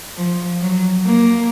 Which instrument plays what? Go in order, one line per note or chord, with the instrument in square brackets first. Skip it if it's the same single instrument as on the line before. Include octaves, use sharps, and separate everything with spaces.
[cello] F3
F#3
A#3